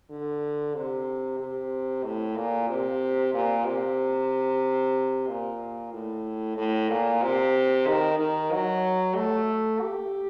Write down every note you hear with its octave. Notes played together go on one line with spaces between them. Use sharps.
D3
C3
C3
A2
A#2
C3
A#2
C3
A#2
A2
A2
A#2
C3
D#3
D#3
F#3
A3
G4